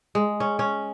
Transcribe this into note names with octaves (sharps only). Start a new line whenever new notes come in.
G#3
C#4
C#4